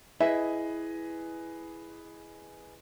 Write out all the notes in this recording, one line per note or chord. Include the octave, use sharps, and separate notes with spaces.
E4 G#4 B4 D#5 E5